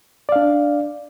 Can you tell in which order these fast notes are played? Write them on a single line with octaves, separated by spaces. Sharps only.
D5 F5 D4